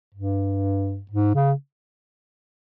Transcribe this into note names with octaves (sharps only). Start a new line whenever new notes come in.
G2
G#2
C#3